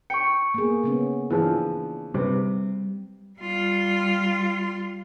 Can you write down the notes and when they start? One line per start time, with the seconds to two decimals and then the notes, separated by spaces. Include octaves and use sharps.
0.10 G5 C#6 C#7
0.54 A#3 B3 G#4
0.84 C#3 B3 C#4
1.30 E3 F3 D4 G#4
2.14 C3 G3 B4
3.39 G3 F4